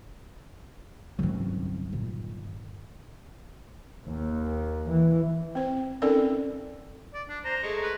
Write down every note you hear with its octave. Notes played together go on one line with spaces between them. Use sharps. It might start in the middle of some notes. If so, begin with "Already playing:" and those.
G1 C2 D#3 F#3 C#4
A#2
D#2
E3
C4 C5
C4 C#4 D#4 A4 A#4 D5
D5
D4
C5 A#5
G#3 A3
B4